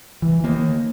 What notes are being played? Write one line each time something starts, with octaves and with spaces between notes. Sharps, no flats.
E3
D#3 A#3